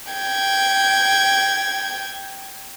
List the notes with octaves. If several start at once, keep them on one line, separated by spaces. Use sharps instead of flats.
G5 G#6